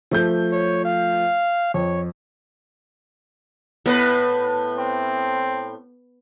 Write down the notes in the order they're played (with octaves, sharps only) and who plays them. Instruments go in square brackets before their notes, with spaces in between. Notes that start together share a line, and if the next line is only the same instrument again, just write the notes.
[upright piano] F3 A3 G6
[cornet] C#5
F5
[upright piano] F2 [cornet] C#5
[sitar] A2 A#4 B4 [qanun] B3
[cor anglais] C4